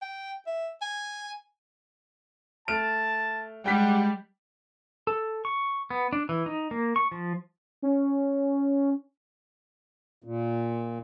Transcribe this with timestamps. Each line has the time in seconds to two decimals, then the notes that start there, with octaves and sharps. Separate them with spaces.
0.02 G5
0.47 E5
0.82 G#5
2.68 A3 A5 F6 D7
3.66 G3 G#3 F#5 G5 B6
5.07 A4
5.45 C#6
5.90 B3
6.13 D4
6.29 E3
6.46 D#4
6.71 A#3
6.96 C#6
7.12 F3
7.82 C#4
10.24 A#2